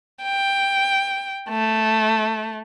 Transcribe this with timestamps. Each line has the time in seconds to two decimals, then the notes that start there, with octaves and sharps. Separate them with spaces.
0.23 G5
1.49 A3